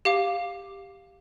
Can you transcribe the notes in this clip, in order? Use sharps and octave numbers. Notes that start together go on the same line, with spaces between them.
G4 F5 D6